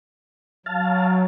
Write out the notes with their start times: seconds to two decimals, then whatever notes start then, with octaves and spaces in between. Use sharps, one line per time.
0.66 F#3 F5 A5